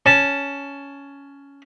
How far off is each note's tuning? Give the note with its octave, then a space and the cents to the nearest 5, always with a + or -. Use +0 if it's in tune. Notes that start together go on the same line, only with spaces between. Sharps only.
C#4 +10 A5 +0